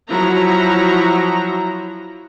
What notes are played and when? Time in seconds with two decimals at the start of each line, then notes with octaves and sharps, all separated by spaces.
0.10 F3 F#3 E4 F#4 A#5